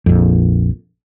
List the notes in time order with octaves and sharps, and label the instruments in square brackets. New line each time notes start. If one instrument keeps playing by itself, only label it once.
[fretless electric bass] A#1 F2